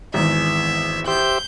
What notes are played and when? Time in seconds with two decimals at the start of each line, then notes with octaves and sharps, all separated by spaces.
0.14 G#1 E2 E5
1.07 G4 C5 E5 G6